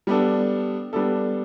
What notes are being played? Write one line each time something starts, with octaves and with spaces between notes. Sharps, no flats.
G3 B3 D4 A4
G3 B3 D4 A4